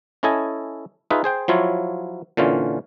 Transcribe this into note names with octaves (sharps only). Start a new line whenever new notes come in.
C#4 E4 A4 D#5 G#5
D#4 F4 G#4 B4 E5
G#4 C5 G5
F3 F#3 E4 F4 C#5
A#2 D3 E3 C#4 F4